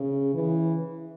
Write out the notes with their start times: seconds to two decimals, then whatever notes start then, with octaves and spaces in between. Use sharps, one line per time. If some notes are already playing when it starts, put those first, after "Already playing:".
Already playing: C#3
0.34 E3